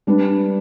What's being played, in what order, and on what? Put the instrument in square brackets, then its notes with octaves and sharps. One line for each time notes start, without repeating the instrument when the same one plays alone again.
[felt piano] G3 D4 B4